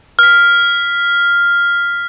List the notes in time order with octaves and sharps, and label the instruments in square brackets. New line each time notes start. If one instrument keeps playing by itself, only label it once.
[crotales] F6 B6